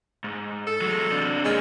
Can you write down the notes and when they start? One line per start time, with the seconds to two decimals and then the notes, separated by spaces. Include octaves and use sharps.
0.24 G#2
0.67 A4
0.82 F#3 G#3
1.11 C3 D4
1.45 G#3 A#3 C#4